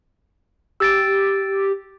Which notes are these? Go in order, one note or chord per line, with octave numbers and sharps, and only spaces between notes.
G4 E6 A6 D7